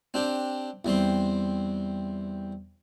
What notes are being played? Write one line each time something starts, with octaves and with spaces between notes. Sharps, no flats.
C4 D4 G4
E2 G3 C4 C6